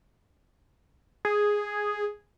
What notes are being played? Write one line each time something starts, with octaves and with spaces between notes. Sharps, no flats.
G#4